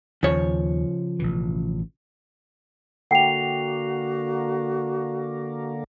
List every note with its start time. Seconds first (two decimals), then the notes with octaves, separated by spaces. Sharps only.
0.23 D#2 C#3 F3 C#5
1.19 A1 B2 E3
3.11 D3 A#3 F#4 F#5 G5 C7 F7